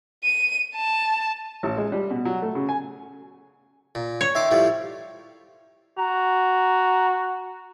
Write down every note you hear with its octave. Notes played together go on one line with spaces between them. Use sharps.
D#7
A5
A1
G#3
G3
B2
F#3
A3
C#3
G#5
A#2
C#5
D#3 E5 C6 D6
A2 F3 G3
F#4 A#5